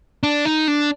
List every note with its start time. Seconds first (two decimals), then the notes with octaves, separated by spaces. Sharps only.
0.23 D4
0.45 D#4
0.68 D4